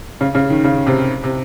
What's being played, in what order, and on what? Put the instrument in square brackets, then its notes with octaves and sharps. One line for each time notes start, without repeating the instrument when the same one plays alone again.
[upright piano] C#3
C#3
D#3
C#3
C3
C3